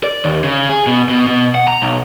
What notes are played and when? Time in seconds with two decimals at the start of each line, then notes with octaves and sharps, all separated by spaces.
0.04 D5
0.24 D#2
0.44 C#3
0.69 G#4
0.87 B2
1.09 B2
1.27 B2
1.55 F#5
1.68 A#5
1.82 B1